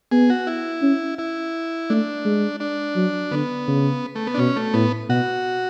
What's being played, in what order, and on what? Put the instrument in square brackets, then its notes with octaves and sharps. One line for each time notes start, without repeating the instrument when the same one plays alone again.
[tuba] B3 [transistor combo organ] G#4
[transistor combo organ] F#4
E4
[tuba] C#4
[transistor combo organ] E4
[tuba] A3 [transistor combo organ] D4
[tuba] G#3
[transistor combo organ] D4
[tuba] F#3
[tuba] D3 [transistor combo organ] B3
[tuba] C#3
[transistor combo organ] A3
B3
D4
[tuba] B2 [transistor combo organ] C#4
[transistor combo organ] A3
[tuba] A2 [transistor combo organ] B3
[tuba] B2 [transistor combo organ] F#4